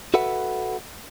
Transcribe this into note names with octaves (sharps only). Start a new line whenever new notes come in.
F#4 A4 B4 E5 F#5